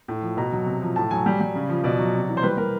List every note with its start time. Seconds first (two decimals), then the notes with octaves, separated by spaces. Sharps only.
0.08 A2
0.22 F3
0.37 B2 A#5
0.52 F#3
0.66 C3
0.82 F3
0.96 A2 A5
1.11 F#3 G#5
1.26 G3
1.41 G3
1.55 C#3
1.69 F3
1.84 B2 D5
1.99 F#3
2.14 C3
2.29 E3
2.37 C5
2.43 G3 B4
2.57 G3 A#4